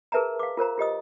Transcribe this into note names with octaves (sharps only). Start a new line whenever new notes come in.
G#4 A#4 B4 E5 A5 A#5
F5 D6
F4 A#4 C5 A#5
F4 G4 D#5 D#6